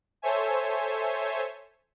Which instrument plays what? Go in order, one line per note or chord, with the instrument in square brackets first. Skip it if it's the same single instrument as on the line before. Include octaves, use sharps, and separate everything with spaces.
[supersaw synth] A4 C5 C#5 E5 G#5